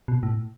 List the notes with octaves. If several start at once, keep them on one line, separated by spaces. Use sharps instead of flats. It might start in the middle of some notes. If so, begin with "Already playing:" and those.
B2
A2